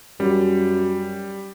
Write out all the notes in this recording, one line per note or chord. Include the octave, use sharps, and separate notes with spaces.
F#2 G3